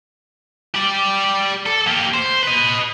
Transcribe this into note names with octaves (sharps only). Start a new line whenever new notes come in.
G4 D5
A4
A#3 G4
C5
B4 D#5